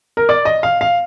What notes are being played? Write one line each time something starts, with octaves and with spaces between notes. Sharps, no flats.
A#4
D5
D#5
F5
F5